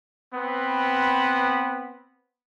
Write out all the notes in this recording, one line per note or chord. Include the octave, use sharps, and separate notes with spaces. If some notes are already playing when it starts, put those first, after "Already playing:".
B3 C4 B4